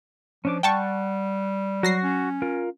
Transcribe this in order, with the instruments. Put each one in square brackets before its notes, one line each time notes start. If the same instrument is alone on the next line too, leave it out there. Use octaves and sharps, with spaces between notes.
[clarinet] F3 [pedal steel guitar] C#4 D4 D6
[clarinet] G3 [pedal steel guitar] F#5 [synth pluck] G5 A5 C#6
[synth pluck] F#3 A#6 C7 [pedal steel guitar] F#4
[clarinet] C#4
[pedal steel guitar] F4 A#4